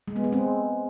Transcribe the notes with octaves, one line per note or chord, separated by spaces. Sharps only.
G#3
B3
G#3
C4